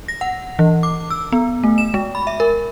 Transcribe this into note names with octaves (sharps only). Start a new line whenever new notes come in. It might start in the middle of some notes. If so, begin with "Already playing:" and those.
A#6
F#5
E3
D6
E6
B3
A3
E7
G#3
B5
E5
A#4